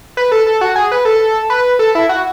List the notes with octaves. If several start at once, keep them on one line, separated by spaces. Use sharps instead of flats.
B4
A4
A4
F#4
G#4
B4
A4
B4
A4
E4
F#4